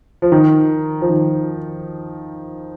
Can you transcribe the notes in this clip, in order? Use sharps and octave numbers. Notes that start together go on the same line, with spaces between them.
F3
D#3
F3
D#3